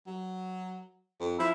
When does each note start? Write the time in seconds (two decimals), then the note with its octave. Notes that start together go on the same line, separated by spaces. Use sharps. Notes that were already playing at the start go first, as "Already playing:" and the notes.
0.07 F#3
1.20 F2
1.40 F3 E4